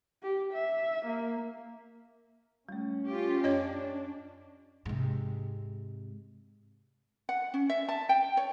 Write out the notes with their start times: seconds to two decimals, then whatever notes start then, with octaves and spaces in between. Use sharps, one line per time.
0.23 G4
0.53 E5
1.06 A#3
2.69 G3 A3 C#4
3.06 F4 G4
3.44 F#2 D4 C#5 D#5 G#6
4.86 G#2 C3
7.29 F#5
7.54 C#4
7.70 E5
7.89 A5
8.09 G5
8.37 C#5